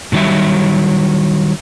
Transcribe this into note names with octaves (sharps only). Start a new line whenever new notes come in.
G#2 D#3 F#3 G3 E5